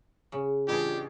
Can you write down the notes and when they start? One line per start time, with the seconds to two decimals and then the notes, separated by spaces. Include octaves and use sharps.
0.32 C#3
0.68 A1 D4 F4 G4 G#4 B5